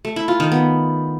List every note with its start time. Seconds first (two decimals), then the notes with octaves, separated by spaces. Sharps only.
0.05 A3
0.16 E4
0.28 F4
0.40 D#3
0.52 B3